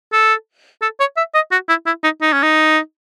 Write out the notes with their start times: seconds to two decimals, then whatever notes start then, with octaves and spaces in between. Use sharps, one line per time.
0.13 A4
0.82 A4
1.00 C#5
1.17 E5
1.35 D#5
1.52 F#4
1.69 E4
1.86 E4
2.04 D#4
2.22 D#4
2.33 C#4
2.43 D#4